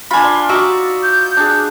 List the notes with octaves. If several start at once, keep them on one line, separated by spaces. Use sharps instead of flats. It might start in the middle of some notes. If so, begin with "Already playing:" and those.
D4 F4 G#5 B5
D5 C6
D#4 F#4 D5 E5 D6
G6
D4 G#4